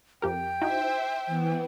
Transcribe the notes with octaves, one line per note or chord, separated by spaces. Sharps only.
F2 G4 A#4 G5
D#4 E4 F#4 C5 E5
E3 B3